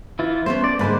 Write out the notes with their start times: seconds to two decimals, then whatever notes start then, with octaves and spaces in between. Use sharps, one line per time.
0.19 E3 E4 F4
0.46 A3 B3 C#4 C5
0.64 D5
0.79 G#2 D3 G#3 A#3 B4 C5